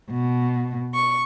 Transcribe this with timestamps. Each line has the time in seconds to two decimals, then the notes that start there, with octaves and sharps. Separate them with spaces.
0.11 B2
0.95 C#6